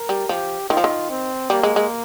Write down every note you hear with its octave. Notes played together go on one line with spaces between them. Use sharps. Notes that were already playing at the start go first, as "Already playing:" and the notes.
Already playing: A#4
G3
F3 G4
D#3 F4
F3
D#3
C4
G3 A#3
G#3
G#3